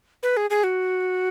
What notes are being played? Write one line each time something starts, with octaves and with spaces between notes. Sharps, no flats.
B4
G#4
G#4
F#4